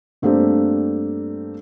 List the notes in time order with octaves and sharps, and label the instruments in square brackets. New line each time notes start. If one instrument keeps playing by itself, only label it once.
[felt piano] G2 A3 A#3 C4 D4 G4